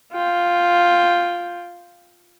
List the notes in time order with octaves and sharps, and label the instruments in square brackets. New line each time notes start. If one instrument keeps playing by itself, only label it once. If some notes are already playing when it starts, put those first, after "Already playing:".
[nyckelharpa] F4 G5